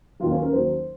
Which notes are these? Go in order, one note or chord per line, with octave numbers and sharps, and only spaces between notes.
D#2 D#3 F#3 F4
C#4
A#4
D#2 D#3 F#3 C5